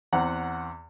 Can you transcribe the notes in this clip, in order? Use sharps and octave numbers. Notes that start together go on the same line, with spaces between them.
E2 C4 F#5 A#5